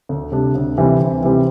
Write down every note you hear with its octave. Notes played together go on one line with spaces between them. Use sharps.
D2
C3 G3 D4
D2
C3 E3 G3 C4
D2
C3 E3 G3 C4